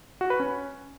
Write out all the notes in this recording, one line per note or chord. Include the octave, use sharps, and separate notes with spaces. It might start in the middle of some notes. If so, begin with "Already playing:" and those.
F#4
B4
C#4